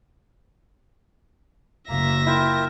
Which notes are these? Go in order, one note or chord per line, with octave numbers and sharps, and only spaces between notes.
F#1 A#3 E5 A#5 A#6
E4 F4 A#4 G5